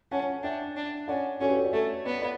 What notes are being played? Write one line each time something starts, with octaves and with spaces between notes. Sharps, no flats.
C#4 F#5 A5
D4 E5 G5
D4
C#4 D5 F#5
C#4 F#4 A4
G4 B4
A4 C#5
B4 D5
A3 C#5 E5
B3 D5 F#5
B4 D5